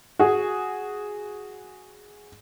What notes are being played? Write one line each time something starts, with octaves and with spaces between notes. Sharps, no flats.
F#4 G#4